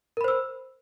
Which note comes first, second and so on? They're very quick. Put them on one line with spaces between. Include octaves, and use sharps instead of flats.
A#4 B5 C5 E6